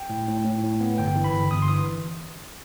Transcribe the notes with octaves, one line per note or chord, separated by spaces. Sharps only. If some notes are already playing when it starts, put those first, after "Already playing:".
Already playing: G5
A2
A2
A2
A2
B3
G1 G5
E3
B5
G1
G1 D#6
C6
E3 D#6